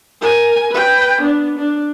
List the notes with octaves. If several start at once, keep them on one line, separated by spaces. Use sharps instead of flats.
A#4 G#5
B4 G5
B3 D4
D4